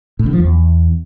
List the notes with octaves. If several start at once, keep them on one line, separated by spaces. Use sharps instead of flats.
A2
D3
F3
E2